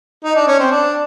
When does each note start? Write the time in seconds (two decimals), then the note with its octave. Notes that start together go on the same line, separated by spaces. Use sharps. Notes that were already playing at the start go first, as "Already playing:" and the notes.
0.24 D#4
0.36 D4
0.47 C#4
0.59 C4
0.71 D4